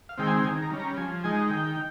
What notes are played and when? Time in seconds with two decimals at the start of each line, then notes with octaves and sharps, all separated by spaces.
0.09 F5
0.18 D#3 G#3 C4 G5
0.27 G#5
0.40 G5
0.44 D#3 G#5
0.62 A#5
0.70 G3 C#4
0.80 A#5
0.97 F3 G#5
1.24 G#3 D#4 G#5
1.50 D#3 G5